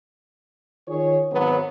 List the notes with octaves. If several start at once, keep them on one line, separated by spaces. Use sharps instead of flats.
D#3 F4 G#4 C#5
G#1 F#3 B3